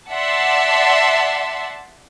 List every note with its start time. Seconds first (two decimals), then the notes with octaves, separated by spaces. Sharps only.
0.12 D5 E5 F#5 A5 C6